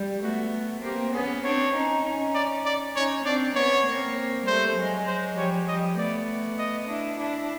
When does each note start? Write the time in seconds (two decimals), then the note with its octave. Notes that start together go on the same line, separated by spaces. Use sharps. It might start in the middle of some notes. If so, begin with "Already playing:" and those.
Already playing: G3
0.23 A3 B3 F#4
0.83 A#3 C4 G4
1.14 B3 C#4 G#4
1.44 C4 D4 C#5
1.74 C#4 D#4
2.05 C#4 D#4
2.35 D5
2.65 D5
2.96 C#4 D#4 C#5
3.25 C4 D4 D5
3.56 B3 C#4 C#5
3.86 A#3 C4
4.47 G3 A3 C5
4.77 F#3 G#3
5.07 C5
5.37 F3 G3 C#5
5.68 F3 G3 D#5
5.98 A3 B3 D5
6.58 D#5
6.88 D4 E4
7.18 D4 E4